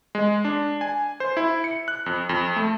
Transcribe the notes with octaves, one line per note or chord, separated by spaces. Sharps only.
G#3
D4
G#5
C5
E4
C#7
F#6
F2
F2
A3